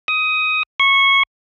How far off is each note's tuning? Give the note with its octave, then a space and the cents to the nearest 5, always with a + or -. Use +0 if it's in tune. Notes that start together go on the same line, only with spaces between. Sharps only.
D#6 +15
C#6 -15